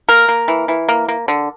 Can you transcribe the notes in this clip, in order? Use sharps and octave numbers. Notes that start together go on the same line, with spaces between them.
A#3 A#4
A#3
E3
E3
A#3
A#3
D3